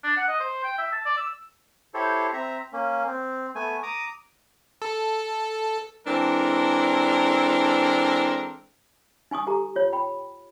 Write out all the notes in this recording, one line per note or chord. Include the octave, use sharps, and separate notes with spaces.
D4
F#5
D#5
C5
G5
E5
A5
D5
E6
E4 G4 A4 C5 C#5
C4 E5 A#5
A#3 C#4
C4
A3 B3 G#5
A#5 D6 D#6
A4
E3 G#3 C4 D4 A4 A#4
D#4 G#5 C#6 D#6
G4 A4 G#5 A#5
F4 C#5
G5 B5